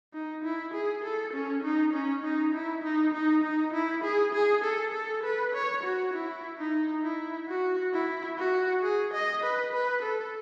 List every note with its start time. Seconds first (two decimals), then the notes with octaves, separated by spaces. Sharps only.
0.14 D#4
0.44 E4
0.74 G#4
1.04 A4
1.33 C#4
1.64 D#4
1.93 C#4
2.24 D#4
2.54 E4
2.84 D#4
3.14 D#4
3.44 D#4
3.74 E4
4.04 G#4
4.34 G#4
4.64 A4
4.94 A4
5.24 B4
5.54 C#5
5.83 F#4
6.14 E4
6.59 D#4
7.03 E4
7.48 F#4
7.93 E4
8.38 F#4
8.83 G#4
9.14 D#5
9.44 B4
9.73 B4
10.03 A4